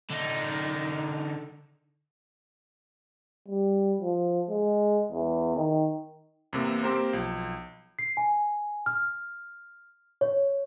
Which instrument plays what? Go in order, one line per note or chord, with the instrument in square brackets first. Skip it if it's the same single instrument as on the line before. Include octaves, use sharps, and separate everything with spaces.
[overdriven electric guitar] D3 D#4
[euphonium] G3
F3
G#3
E2
D#3
[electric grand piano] E2 C3 A#3
A#3 C4 G4 A#4 C5
B1 F3
[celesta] C7
G#5
F6
C#5